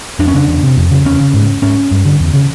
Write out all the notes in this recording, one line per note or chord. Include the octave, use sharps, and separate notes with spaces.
F2 D4
C#4
C#3 D4
E2
C3
F2
C#3
E2 C#4
C#3
G#2
G#2 C#4
G2
D3
E2
C#3